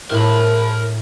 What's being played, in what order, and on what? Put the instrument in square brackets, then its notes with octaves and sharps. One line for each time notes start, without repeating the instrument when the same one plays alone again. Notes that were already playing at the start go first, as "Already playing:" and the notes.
[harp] A2 E4 [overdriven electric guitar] A#4 B5